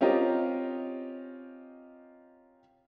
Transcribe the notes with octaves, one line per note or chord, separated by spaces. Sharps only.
C4 C#4 F4 G4 A#4 D#5